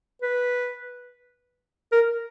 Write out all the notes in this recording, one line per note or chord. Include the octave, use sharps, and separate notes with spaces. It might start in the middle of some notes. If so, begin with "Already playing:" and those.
B4
A#4